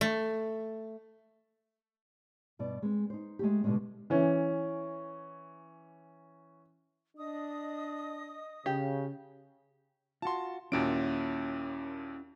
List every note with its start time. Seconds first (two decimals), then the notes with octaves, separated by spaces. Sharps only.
0.01 A3
2.59 G2 B2 D5
2.82 G#3 C4
3.10 D#4 C5
3.39 G#3 A3 G4
3.64 B2 D3 E3 G3 G#3 C4
4.10 E3 C#4
7.17 D4 D#5 D#6
8.66 C#3 G4
10.22 F4 F#4 A5 C6
10.72 D#2 A#2 C#4 E4 F#4 D7